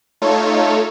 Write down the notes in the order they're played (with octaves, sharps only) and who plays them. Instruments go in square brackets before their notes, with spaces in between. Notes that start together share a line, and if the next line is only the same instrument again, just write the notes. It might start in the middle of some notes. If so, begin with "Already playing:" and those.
[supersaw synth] A3 D#4 F4 A4 C#5